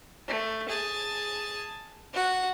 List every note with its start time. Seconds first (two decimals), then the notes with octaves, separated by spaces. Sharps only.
0.28 A3
0.68 G#4 A5
2.13 F#4 F#5